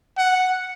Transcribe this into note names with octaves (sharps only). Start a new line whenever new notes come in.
F#5